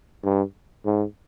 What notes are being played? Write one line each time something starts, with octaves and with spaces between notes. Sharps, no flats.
G2
G#2